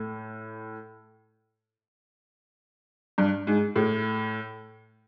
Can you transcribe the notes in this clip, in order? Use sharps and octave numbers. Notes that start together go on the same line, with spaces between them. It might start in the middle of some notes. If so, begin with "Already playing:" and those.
Already playing: A2
G2
G#2
A2